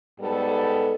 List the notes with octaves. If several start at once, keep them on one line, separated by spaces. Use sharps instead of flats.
G#2 G3 B3 A4